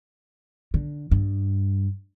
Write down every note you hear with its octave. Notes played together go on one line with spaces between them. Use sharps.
D3
G2